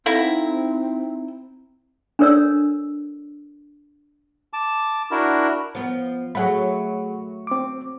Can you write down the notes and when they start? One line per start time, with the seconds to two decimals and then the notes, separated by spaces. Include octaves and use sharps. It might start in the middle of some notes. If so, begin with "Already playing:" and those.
0.06 C4 D#4 E4 A4 F5 F#5 A#5
2.19 D4 A4 A#4 C#5 D5 E6
4.53 A5 D6
5.11 D4 E4 F#4 A#4
5.75 F3 B3
6.35 F#3 A3 G#4 F#5 B5
7.47 C4 D6